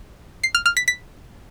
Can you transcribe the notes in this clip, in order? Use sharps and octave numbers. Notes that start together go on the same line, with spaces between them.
C7
F6
F6
B6
B6